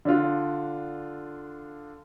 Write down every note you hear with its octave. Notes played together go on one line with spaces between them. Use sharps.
D3 D4 F4